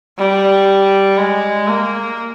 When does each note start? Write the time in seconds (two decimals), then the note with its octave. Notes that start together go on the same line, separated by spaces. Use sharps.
0.18 G3
1.18 G#3
1.68 A#3